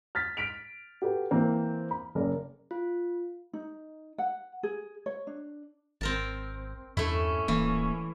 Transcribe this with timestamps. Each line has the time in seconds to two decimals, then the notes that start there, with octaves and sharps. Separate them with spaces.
0.15 F6 A6 B6
0.37 F6 B6 D7 F7
1.02 F#4 G4 A4 B4
1.31 E3 A#3 C4
1.91 B5
2.15 F#1 A#4 D5
2.71 F4
3.53 D#4
4.18 F#5
4.63 G#4
5.06 C#5
5.27 D4
6.01 G#1 C4 A#4 A5
6.97 E2 G2 A3 C#4 E4
7.48 D1 E3 A#3